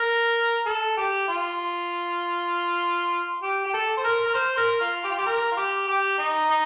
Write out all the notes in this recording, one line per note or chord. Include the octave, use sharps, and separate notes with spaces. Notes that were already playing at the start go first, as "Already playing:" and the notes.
Already playing: A#4
A4
G4
F4
G4
G4
A4
C5
A#4
A#4
C5
A#4
F4
G4
F4
G4
A#4
F4
G4
G4
D#4
D#4